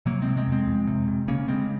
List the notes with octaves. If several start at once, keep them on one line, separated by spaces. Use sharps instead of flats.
C3 F#3 A#3
G#3 C4
C3
G#3 C4
F2 G#3 C4
F2
C3
C3
C#3 A#3 C#4
C#3 G#3 C4